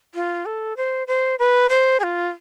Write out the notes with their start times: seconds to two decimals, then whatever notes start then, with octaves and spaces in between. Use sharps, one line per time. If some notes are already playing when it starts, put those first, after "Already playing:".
0.15 F4
0.45 A4
0.77 C5
1.07 C5
1.39 B4
1.69 C5
2.00 G#4
2.03 F4